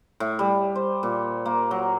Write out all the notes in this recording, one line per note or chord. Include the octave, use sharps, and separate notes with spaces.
A2
G3
C5
A#2
A#3
F#3